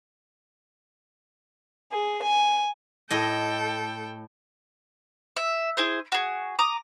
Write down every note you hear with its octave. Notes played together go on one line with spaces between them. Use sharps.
G#4
G#5
A2 A4 D#5 G5
E5
E4 G#4 C5
F#4 G#4
A#5 D6 D#6